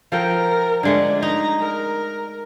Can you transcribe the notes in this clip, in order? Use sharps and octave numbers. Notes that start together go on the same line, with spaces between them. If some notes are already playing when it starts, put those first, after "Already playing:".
F3 A4 A#4 G5
D3 G#3 A3 D5
D#4 A#5
A#4